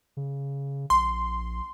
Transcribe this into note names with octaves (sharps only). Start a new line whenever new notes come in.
C#3
A#1 C6